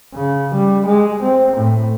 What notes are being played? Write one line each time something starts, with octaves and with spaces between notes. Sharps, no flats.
C#3
G3
G#3
C4
A2